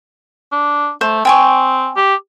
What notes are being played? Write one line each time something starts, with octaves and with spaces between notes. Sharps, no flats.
D4
A3 C5
C4 G5 G#5 C#6
G4